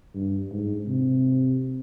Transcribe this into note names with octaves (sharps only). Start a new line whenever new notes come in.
G2
G#2
C3